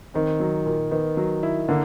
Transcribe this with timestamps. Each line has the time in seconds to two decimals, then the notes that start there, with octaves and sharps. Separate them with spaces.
0.14 D#3 C4
0.40 F#3
0.66 A#2
0.91 D#3 B3
1.17 F#3
1.43 E4
1.69 D3 A#3